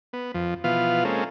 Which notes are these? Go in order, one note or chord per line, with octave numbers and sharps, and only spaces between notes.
B3
F2 F3
B2 E3 F3 B3 F4 F5
G#3 A#3 C4 C#4 A4